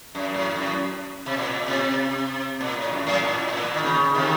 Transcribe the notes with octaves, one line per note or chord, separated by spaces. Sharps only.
F#2
A2
F#2
C3
A#2
C3
A#2
A2
F#2
A2
A#2
A2
A#2
D#3
C#3
C3 D#3